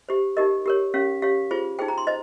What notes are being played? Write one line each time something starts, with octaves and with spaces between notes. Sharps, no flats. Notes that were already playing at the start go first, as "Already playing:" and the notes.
G4 C5
D#4 G4 A#4 D#5
G4 A#4 C#5
C#4 G4 C#5 F5
G4 C#5 F5
F4 G#4 C5
D#4 G#4 C5 G5
A#5
C6
C5 D#5